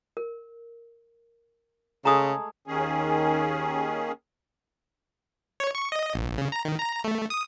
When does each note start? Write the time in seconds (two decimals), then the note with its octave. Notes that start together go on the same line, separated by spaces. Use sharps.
0.17 A#4
2.05 C#3 G#3 A3 G#4 A#5 C#6 D#6
2.67 D#2 D#3 C#4 G#4
5.60 C#5
5.75 C#6
5.92 D#5
6.14 A#1
6.38 C#3
6.52 A#5
6.65 D#3
6.78 A#5
7.04 A3
7.30 D#6